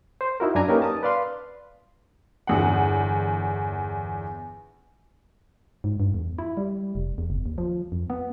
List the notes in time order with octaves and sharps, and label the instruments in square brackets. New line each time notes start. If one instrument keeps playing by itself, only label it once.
[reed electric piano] C5
D#4 E4 F#4 A#4
F#2 D4 G#5 A#5
A#3 C#4 D#4 G4 A#4 B4
A5 D#6
B4 D5 F5 C6
[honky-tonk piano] G1 E2 F#5
[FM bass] G#2
G2
E2
E4
G3
F1
E2
F#1
D#2
F3
F2
B3